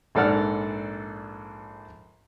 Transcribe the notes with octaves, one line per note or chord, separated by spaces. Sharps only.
A#1 G#2 A4 D5 F#5 F6